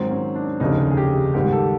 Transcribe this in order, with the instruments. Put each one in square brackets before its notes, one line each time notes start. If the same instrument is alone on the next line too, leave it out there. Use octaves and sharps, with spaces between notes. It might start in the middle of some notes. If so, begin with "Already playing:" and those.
Already playing: [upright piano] G#2 D#3 F#3 [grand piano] C4
[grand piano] C#4
D4
[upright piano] F1 D#2 C#3 [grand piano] D#4
[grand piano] G#4
G4
[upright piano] G#2 D#3 G3 [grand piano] G4
[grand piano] A4